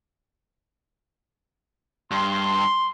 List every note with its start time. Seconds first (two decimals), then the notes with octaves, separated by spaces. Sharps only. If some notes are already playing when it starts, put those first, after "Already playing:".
2.11 G2 C6